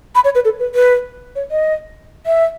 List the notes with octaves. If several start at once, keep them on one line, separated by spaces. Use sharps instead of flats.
B5
C#5
B4
A4
B4
B4
C#5
D#5
E5